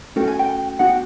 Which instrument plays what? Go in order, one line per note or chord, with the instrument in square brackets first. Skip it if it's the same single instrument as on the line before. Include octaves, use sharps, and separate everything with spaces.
[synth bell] A3 C#4 F#4 A4 [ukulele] G5
[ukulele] G#5
G5
[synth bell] B3 D4 F#4 [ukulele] F#5
[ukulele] G5